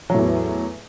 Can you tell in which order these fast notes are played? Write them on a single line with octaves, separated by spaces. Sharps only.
F#3 A2 E2 E3